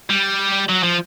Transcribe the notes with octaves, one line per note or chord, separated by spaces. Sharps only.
G3
F#3
F3